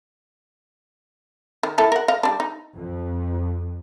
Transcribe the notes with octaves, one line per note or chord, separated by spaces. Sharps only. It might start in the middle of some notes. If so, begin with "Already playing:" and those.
D#3
E4 A4 A#4
A#4 F#5
D#5 F5
G3 D4
D#4
F2